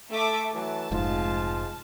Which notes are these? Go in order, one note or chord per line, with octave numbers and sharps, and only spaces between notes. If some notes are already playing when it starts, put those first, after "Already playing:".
A3 A4 E5 D6
E3 F#3 A3 A5
F1 G#2 F3 G#3 F4